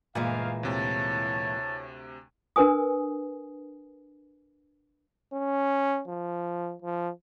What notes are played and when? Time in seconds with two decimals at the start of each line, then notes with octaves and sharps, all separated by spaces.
0.15 G1 A#2 E3 G#3 F5
0.63 D2 C3 E4 C#5 A5 A6
2.56 D4 A#4 B4 G#5 D#6
5.33 C#4
6.08 F3
6.82 F3